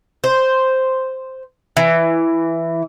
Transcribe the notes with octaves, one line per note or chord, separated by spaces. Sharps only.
C5
E3